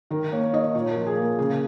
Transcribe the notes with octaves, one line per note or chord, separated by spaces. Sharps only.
D#3 A#4
A#3 C#5
D#4 D#5
A#2 C#5
A#4
F3
G#4
A#3
A#4
C#3 G#4